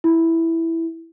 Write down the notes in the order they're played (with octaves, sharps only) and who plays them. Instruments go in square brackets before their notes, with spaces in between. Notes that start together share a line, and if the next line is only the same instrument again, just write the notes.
[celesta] E4